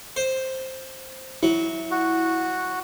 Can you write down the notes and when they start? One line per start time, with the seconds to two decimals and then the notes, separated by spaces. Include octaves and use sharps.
0.16 C5
1.43 F#3 E4
1.91 F#4